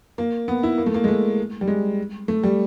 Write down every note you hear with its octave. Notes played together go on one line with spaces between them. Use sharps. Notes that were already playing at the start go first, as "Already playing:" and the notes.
A#3
B3
E4
A#3
A3
A#3
G#3
A3
G3
G#3
A3
G3